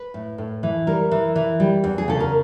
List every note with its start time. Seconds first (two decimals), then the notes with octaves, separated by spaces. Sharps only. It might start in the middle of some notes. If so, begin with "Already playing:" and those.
Already playing: B4
0.14 A2
0.38 A2
0.63 E3
0.87 G3 A#4
1.11 E3
1.36 E3
1.60 G3
1.84 E2
1.98 G#4
2.08 C#3 A4
2.20 A#4